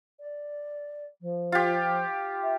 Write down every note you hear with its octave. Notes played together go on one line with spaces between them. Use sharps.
D5
F3
F4 G4
E5